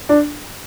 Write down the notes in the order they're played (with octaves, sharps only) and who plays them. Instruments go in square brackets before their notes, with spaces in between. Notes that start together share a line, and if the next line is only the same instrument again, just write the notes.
[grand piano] D4